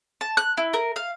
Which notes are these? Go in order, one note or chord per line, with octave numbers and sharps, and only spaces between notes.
A5
F#6
E4
A#4
F5